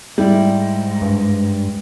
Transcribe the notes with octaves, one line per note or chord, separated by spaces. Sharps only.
G#2 G3 E4
G2